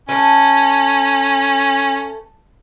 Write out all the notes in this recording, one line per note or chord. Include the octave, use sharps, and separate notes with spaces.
A3 C#4 B4